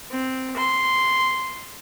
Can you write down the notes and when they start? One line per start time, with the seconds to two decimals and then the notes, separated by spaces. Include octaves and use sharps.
0.11 C4
0.56 C6